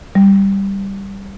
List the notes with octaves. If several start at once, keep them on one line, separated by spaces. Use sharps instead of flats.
G3